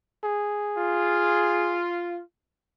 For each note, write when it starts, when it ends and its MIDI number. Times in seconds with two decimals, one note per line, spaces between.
0.24 1.83 68
0.77 2.21 65